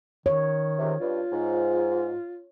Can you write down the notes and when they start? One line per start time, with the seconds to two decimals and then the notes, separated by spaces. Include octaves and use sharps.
0.26 D#3 C#5
0.79 C#2 C3
1.00 G2 F4
1.30 G#2